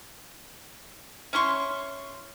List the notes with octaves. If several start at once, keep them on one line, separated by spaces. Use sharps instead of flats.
C#4 E4 C6 C#6